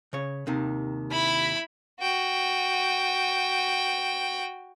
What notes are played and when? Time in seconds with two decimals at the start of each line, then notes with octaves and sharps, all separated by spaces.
0.13 C#3 C#5
0.47 D#2 C3 D#3
1.11 E4 B5
2.00 F#4 G5